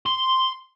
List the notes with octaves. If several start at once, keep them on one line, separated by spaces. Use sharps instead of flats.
C6